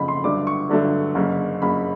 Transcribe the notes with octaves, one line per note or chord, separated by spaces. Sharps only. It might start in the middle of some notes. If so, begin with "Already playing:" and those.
Already playing: F#1 F2 C#3 B5
C6
G2 D3 F#3 A3 D6
C#6
G2 D3 F#3 A3
F#1 F#2 C#3
F#1 F#2 C#3 B5